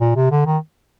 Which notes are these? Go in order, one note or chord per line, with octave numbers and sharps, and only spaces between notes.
A#2
C3
D3
D#3